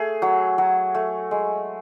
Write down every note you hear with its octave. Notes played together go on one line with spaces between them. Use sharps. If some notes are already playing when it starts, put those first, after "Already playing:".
Already playing: A3 G#4
F#3
F#3
A3
G#3